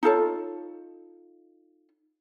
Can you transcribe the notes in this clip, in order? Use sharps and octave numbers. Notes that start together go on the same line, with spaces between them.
D#4 F4 A4 C#5